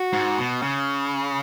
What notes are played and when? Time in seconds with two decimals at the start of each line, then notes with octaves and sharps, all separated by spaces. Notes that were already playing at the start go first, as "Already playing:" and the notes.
Already playing: F#4
0.13 G#2
0.38 B2
0.62 C#3